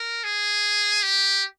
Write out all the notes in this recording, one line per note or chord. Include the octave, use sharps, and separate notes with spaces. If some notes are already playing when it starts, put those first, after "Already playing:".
Already playing: A#4
G#4
G4